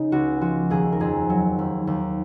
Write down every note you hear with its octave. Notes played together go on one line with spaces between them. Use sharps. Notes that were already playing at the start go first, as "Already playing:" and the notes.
Already playing: C#3 D#4
C#2 F#4
F3 F#4
D#2 G#4
A#4
F2 G#4
F#3
D#2
D#2